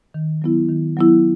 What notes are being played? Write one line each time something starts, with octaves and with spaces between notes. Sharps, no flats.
D#3
F#3 B3 E4
D#3
F#3 B3 E4